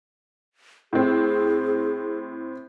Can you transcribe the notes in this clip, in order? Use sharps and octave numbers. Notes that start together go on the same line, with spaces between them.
A2 C4 G#4